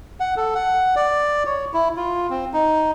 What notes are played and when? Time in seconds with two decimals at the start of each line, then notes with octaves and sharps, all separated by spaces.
0.20 F#5
0.37 A4
0.55 F#5
0.96 D5
1.46 C#5
1.74 E4
1.97 F4
2.30 C4
2.53 D#4